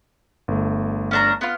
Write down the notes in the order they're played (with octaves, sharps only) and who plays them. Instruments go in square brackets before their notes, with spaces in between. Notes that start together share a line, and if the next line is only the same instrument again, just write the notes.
[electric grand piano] G1 A3
[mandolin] C#4 D4 A#5
B3 F4